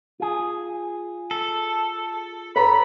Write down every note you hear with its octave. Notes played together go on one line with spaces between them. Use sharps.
F4 G#4
A4
A4 B4 C#5 A#5 B5